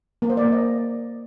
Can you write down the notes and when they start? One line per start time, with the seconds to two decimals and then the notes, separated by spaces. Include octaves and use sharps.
0.22 A#3
0.30 C5
0.37 D5
0.45 A#3
0.52 D#5